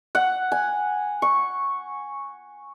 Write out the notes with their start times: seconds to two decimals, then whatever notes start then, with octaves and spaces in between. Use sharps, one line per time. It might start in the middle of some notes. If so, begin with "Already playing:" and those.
0.15 F#5
0.52 G#5
1.22 C#6